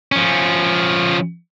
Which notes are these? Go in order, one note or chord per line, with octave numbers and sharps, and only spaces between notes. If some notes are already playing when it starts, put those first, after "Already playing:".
F3 C#4